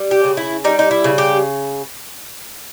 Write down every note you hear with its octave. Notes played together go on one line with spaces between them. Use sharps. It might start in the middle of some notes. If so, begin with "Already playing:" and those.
Already playing: G3
G4
C#3
E4
G3 D#4
D#4
E4
C#3
G4